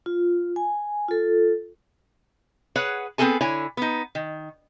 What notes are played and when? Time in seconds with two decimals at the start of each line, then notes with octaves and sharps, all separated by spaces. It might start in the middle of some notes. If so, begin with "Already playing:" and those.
0.06 F4
0.56 G#5
1.08 F4 A4
2.76 G#4 B4 C#5 F#5
3.18 B3 C4 E4 G#4 A4 G#5
3.41 D3 E4 C#5 G#5
3.77 B3 D#4
4.15 D#3